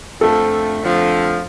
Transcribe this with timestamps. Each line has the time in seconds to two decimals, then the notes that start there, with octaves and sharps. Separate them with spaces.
0.21 F2 D3 F3 A3 A4
0.82 F2 D3 F3 A3